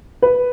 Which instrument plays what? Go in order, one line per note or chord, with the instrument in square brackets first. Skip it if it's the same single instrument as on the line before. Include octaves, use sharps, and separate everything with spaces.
[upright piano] B4